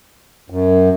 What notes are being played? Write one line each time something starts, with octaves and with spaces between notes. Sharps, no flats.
F#2